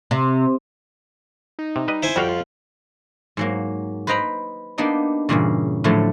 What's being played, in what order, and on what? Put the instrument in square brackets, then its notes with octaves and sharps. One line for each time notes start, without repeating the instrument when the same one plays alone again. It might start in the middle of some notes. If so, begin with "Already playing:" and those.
[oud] C3
[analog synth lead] D#4
[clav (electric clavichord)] C3
G3 B4 D#5
[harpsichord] E4 C5 G#5
[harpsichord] F2 [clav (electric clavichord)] G3 F#4 F5 [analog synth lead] G5
[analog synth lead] F4
[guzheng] G#2 F#3 A#3
B4 C5 D#5 G5 A#5 B5
A#3 B3 D4 D#4 G4
E2 G2 A#2 C#3
A2 D3 F3 F#3 A3